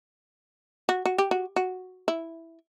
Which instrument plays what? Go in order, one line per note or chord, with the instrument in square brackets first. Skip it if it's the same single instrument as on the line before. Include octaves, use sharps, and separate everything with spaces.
[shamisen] F#4
F#4
G4
F#4
F#4
E4